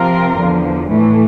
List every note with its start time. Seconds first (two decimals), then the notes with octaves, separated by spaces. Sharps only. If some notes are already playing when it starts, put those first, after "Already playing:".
Already playing: C3 F3 C4 F4 A#4
0.39 E2 D3 F3
0.89 A2 E3 A3